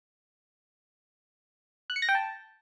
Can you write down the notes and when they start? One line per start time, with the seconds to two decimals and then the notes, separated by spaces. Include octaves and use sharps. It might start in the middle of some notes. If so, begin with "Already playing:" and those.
1.90 F#6
1.96 C#7
2.02 A#6
2.09 G5
2.15 A5